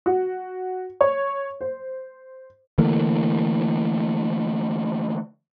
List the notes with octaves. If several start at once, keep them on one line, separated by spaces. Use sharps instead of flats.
F#4
C#5
C5
D3 E3 A3 A#3